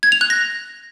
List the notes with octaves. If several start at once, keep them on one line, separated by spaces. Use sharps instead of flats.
G#6
F7
F#6
A#6